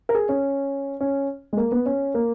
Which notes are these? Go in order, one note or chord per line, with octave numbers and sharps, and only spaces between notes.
A#4
G#4
C#4
C#4
G#3
A#3
B3
C#4
A#3